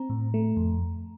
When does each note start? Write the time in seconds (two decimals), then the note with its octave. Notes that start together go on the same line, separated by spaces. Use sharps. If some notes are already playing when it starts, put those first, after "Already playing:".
Already playing: C4 A#5
0.10 A2
0.34 A3
0.57 F2